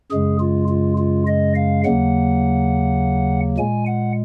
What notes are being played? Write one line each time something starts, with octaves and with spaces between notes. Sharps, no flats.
F#2 C#3 G#3 G#4
F4
F4
F4
D#5
F5
D#2 C#3 F#3 A#3 F#5
A#2 G#3 G#5
F#5